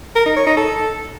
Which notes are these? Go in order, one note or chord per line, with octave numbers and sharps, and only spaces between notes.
A#4
D#4
C#5
D#4
A4